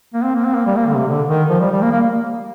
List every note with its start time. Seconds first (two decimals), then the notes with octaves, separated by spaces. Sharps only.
0.14 A#3
0.24 C4
0.35 A#3
0.45 C4
0.55 A#3
0.66 G3
0.76 A#3
0.87 D3
0.97 C3
1.08 D3
1.29 D#3
1.50 F3
1.60 G3
1.71 G3
1.82 A#3
1.92 A#3